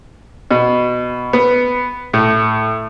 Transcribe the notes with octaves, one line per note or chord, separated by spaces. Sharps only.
B2
B3
A2